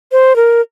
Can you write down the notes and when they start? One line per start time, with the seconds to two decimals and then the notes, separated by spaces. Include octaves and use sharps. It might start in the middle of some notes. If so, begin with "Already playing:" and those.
0.12 C5
0.36 A#4